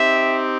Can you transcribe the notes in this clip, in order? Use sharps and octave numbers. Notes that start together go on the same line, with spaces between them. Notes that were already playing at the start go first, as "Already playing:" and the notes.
Already playing: C4 D#4 G4 E5